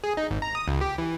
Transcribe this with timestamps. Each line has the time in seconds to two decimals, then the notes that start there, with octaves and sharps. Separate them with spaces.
0.04 G#4
0.17 D#4
0.31 G#1
0.42 A#5
0.55 D#6
0.68 C#2
0.81 G4
0.98 E3